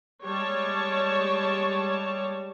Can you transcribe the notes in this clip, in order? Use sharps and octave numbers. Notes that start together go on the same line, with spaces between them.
G3 G#3 C#5 A5